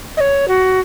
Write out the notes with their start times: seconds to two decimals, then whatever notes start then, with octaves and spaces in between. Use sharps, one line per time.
0.17 D#5
0.20 C#5
0.48 F#4